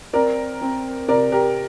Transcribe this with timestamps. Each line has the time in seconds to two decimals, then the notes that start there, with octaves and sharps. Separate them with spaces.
0.13 C4 A#4 D5
0.61 C4
1.08 C3 A#4 D5
1.32 G4 A#4